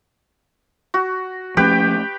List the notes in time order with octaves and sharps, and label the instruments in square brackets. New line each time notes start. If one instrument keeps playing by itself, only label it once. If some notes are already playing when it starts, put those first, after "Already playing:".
[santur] F#4
[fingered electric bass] F3 A3 C#4 [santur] G4 B4 G5